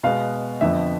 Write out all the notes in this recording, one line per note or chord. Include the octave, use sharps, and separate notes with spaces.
B2 G#3 B3 F5
F2 D3 F3 B3 E5